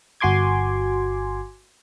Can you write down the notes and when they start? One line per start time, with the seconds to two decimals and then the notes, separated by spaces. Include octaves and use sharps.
0.20 G1 F#4 G#5 C6 D6 G#6